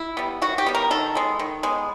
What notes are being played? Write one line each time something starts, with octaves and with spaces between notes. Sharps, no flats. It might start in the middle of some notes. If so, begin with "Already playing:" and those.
Already playing: E4
G3 B3
D#3 F#4
G4
G3 B3
A#4
D#3 A4
G#3 B3
D#3
G#3 B3